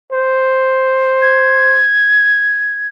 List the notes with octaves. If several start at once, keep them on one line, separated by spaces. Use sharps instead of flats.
C5
G#6